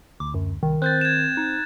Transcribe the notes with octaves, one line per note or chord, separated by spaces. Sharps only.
D2 D6
F#2
C2 D#3
C4 F#6 G6 A6
G#6 E7
D#4